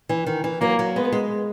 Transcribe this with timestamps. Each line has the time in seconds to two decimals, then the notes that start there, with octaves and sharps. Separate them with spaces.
0.09 E3
0.26 D#3
0.44 E3
0.61 F#3 A#3
0.79 F#3
0.96 G#3 B3
1.12 G#3